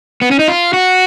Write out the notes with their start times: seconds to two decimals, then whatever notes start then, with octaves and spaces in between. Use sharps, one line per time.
0.22 B3
0.31 C#4
0.39 D#4
0.48 F4
0.73 F#4